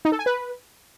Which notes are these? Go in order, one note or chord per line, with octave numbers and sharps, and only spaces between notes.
D#4
A4
G#5
B4